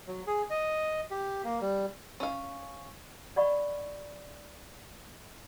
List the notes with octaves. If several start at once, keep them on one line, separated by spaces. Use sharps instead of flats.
F#3
G#4
D#5
G4
A#3
G3
C#4 F5
D5 D#5 F#5 B5 C#6